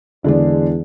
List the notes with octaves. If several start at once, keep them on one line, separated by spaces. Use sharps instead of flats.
E2 D3 G#3 D4